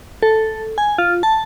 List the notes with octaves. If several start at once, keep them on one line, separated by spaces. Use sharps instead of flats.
A4
G#5
F4
A5